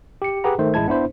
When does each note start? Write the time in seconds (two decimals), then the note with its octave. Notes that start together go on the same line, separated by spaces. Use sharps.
0.22 G4 C#7
0.44 G4 G#4 B4 F#5 A#5
0.59 D#3 A3 C5
0.74 A1 G#3 E4 A5 G#6
0.88 B3 D4 E4 C5